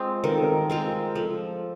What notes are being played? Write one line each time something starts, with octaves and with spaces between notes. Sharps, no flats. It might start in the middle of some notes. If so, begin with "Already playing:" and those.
Already playing: G#3 C4 F4
D#3 A#4
A4
A#4
G#3 C4 F4
F3 A4